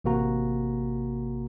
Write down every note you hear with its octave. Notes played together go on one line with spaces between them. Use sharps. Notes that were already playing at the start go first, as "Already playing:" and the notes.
A1 C3 A#3 F#4 A#5